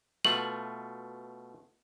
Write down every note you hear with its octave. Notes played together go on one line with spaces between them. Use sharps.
B2 A3 F4 F#7